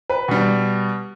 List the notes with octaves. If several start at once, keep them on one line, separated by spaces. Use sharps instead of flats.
B4
B2 G3